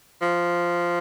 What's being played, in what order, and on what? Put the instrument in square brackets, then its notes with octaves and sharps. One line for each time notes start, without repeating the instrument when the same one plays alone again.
[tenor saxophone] F3